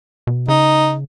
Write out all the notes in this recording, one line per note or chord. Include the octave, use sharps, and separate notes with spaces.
B2
C#3 D#4